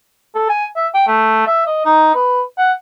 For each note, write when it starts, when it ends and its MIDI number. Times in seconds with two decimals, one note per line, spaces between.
0.35 0.47 69
0.49 0.66 80
0.76 0.87 76
0.94 1.03 79
1.07 1.43 57
1.47 1.65 76
1.67 1.81 75
1.85 2.13 63
2.15 2.41 71
2.58 2.72 78